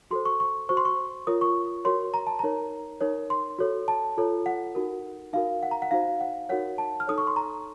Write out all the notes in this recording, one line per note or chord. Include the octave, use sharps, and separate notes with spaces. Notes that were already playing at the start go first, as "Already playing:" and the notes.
F#4 A4 C5 C6
C#6
C#6
F#4 C5 C#6
C6
C#6
F4 A#4 C#5 D#6
C#6
F#4 A#4 C#5 C6
A#5
A5
D#4 A#4 C#5 A#5
D#4 A#4 C#5
C6
F#4 A4 C#5
A5
F4 A4 C#5
F#5
D#4 F#4 A#4
D#4 F#4 A#4 F5
F#5
A#5
F#5
D#4 F#4 C5 F5
F#5
D#4 F#4 A#4 C#5 F#5
A5
F6
D#4 A4 C#5 D#6
C#6
C6
A#5